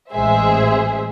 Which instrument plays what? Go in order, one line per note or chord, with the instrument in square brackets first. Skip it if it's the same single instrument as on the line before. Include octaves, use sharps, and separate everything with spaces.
[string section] A1 G#3 G#4 C5 E5